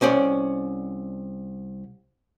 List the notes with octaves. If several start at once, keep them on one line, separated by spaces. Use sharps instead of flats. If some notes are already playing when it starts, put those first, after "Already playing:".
C2 C#4 C5 D5